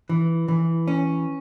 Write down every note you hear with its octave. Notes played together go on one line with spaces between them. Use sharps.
E3
E3
C#4